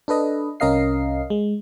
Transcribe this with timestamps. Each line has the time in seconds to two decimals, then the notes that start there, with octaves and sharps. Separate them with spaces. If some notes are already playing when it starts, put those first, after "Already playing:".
0.08 D4 A4 B4 D#5
0.60 C2 C#4 A#4 D#5 F5 C7
1.30 G#3